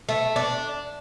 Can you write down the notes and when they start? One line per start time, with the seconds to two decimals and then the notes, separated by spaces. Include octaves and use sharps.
0.09 A3
0.36 D4